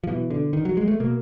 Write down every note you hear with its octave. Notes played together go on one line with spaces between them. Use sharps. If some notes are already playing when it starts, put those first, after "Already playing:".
F3
B2 E3
D3
D#3
F#3
G#3
A3
B2 A#3